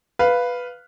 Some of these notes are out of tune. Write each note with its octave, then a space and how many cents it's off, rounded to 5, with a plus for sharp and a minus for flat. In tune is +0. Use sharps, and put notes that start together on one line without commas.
B4 +0 F5 +0